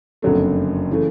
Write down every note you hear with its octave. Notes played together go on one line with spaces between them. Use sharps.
F#1 F2 D3 F#3 A3
C#3 E3 A3